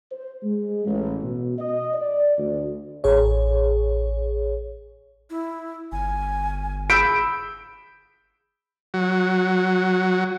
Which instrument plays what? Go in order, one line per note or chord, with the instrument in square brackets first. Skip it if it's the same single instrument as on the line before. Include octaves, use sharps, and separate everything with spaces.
[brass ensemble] C5
G#3
A1
B2
D#5
D5
D2
[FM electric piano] A1 G#4 C#5
[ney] E4
[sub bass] G1 [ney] G#5
[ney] G#4 [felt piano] B5 G6 B6 [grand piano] E6 D7
[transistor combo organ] F#3